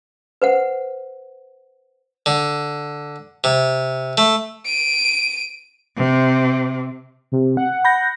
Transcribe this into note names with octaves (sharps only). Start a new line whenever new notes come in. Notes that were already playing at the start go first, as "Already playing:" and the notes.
B4 C5 F#5
D3
C3
A3
D7 D#7
C3
C3
F#5
B5 G6 A#6